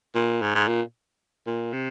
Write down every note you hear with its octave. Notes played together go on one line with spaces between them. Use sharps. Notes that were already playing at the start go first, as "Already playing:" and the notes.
A#2
G#2
G#2
A#2
A#2
C3